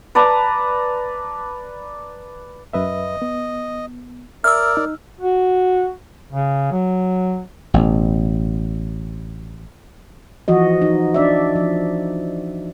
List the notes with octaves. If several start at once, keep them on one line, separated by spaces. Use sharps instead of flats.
B4 D5 A5 A#5
F#2 B4 D#5 E5
B3
A#4 D5 E5 E6 F6
D#4
F#4
C#3
F#3
A1 B2
E3 F3 F#4 D#5
D#4
D4 D5 E5
F3